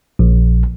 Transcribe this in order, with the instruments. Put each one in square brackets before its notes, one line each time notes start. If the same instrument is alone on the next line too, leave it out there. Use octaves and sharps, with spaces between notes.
[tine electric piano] A#1